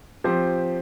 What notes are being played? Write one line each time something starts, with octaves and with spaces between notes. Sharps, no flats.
F3 C4 G4 C5